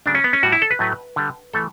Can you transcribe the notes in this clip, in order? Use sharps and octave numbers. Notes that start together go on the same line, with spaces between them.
C#3 F#3 A3 D4
C#4
B3
C#4
A2 G3 F#4
E4
A4
B4
A2 F#3 A3
D3 G3
E3 A3 A4